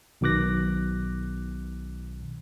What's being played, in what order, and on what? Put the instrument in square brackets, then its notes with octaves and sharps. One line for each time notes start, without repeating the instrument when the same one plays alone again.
[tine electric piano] B1 B2 D#3 D6 F#6 A#6